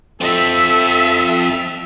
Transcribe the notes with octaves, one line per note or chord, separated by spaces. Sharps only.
F3 C4 A4 E5